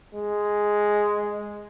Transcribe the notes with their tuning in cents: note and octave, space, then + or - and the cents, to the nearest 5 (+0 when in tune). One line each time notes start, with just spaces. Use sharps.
G#3 +0